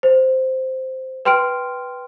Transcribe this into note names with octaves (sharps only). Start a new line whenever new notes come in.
C5
B4 G5 C6 F6 D7